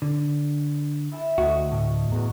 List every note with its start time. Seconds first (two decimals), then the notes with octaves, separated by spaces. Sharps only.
0.02 D3
1.12 E4 E5 A5
1.38 D2 F#4 C#5 D#5
1.72 A2
2.10 E2 F#4 A#5